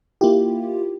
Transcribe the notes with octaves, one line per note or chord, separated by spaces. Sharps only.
A#3 E4 F4 G4